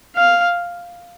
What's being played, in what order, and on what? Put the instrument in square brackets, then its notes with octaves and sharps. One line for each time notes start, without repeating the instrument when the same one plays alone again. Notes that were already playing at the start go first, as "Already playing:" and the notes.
[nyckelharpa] F5